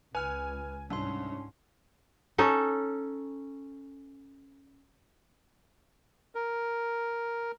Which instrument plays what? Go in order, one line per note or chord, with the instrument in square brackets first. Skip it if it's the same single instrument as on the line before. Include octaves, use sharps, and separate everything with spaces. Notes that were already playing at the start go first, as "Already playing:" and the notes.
[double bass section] C#2 [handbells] B4 F6 [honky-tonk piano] G#5
[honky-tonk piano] C2 [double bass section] G#2 C#4 [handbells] D4 C6
[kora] C#4 D#4 A4
[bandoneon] A#4